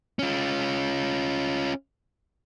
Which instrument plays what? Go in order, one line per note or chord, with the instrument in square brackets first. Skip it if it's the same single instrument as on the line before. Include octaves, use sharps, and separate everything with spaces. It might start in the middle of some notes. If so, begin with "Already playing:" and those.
[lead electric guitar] C#4 F4